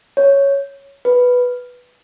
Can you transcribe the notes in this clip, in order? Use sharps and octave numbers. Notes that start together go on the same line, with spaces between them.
C#5
B4